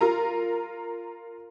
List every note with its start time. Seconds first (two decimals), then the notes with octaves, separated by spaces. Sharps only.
0.01 F4 A#4 A#5